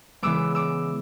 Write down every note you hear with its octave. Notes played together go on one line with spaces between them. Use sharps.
C#3 E3 G#3 B3 D6 E6
D6 E6